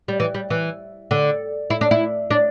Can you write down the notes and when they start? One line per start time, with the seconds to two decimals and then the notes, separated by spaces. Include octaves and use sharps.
0.08 G3
0.20 E3
0.34 G3
0.50 E3
1.11 D3
1.70 E4
1.81 D4
1.91 E4
2.31 D4